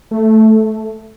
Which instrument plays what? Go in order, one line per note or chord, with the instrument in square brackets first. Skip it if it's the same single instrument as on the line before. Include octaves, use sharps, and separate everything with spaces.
[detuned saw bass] A3